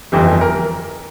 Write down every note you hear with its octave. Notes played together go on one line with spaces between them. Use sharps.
G1 F2 E3 G4
A#4